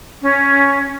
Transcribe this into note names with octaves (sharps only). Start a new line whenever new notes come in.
C#4